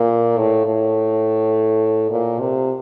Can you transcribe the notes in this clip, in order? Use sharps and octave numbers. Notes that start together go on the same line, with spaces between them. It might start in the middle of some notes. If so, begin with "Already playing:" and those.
Already playing: A#2
A2
A2
A#2
C3